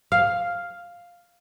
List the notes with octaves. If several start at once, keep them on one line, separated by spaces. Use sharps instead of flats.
F5